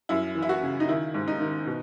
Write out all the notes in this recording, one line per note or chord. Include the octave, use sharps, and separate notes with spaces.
F#2 E4
E3
E4
F#4
C#3
D#4
D#3 E4
G#2
D#4
D#3
B2